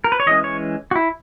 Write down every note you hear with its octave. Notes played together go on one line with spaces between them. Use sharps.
A#4
B4
C#5
E3 G#3 C#4 D#5
C#5
F#4
E4